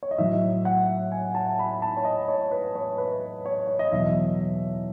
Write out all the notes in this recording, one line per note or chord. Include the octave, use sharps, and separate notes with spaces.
C#5
D#5
A2 F#3 E5
F#5
G#5
A5
B5
A5
C#5
D#5
C#5
B4
C#5
B4
C#5
C#5
D#5
E2 B2 F#3 E5